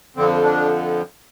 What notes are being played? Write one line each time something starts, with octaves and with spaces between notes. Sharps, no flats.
F2 D3 F3 C4
D4